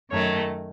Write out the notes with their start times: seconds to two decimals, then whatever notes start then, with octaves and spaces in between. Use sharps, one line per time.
0.11 F#2 D#3 A3 C#5